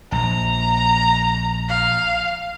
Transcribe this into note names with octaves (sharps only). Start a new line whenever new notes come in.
A#1 A#5
F5